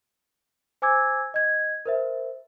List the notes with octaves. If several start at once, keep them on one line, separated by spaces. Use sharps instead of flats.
C5 G#5 D6 E6 G#6
D#5 G#6
A#4 C5 E5